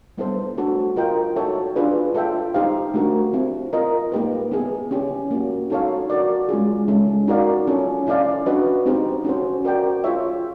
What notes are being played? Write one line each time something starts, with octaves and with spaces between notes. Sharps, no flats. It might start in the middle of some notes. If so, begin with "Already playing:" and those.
G3 B3 E4 A4 C5
A3 D4 F#4 A4
F4 A#4 D#5 G5
D#4 F#4 A4 C#5 E5
D4 F4 G#4 B4 D5
F4 A4 C#5 E5 G5
D#4 G4 C5 F5
A3 D4 F#4 A#4
C4 E4 G4
F4 A#4 D#5
A#3 D#4 G4 B4
B3 E4 G#4
C#4 E4 G4
A#3 C#4 F#4
D#4 F#4 A4 C#5 F5
F#4 A#4 D5
G#3 C#4 F4 G#4
G#3 C#4 E4 A4
D#4 F#4 A#4 D5 F5
C#4 F4 A4
C#4 E4 A4 D5 F5
D4 F#4 B4 D#5
C4 D#4 G4 C5
C#4 F#4 A4 C5
F#4 A#4 D5 G5
F4 G#4 C#5 E5